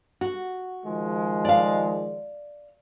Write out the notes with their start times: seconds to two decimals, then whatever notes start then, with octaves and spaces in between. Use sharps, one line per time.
0.21 F#4
0.86 D#3 F3 G#3
1.45 D5 F5